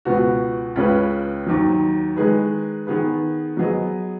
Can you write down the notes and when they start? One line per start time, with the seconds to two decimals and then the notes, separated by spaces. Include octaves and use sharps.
0.05 C#2 B2 B3 F#4
0.76 C#2 C#3 G#3 C#4 B4
1.46 D#2 D#3 F#3
2.16 D#3 G#3 D#4 G#4 B4
2.87 D#3 B3 G#4 B4
3.57 F#3 B3 G#4 D#5